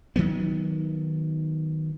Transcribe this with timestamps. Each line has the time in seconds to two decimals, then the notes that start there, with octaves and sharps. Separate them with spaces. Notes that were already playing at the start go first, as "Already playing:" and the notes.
0.16 D#3 F#3 B3